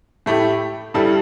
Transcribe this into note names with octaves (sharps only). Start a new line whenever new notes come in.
A2 A3 E4 G4
G2 G3 E4 A4